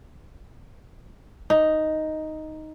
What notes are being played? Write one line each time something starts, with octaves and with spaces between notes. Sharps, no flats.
D#4